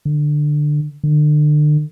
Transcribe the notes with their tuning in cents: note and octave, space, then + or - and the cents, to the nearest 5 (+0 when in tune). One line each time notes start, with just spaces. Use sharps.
D3 +15
D3 +35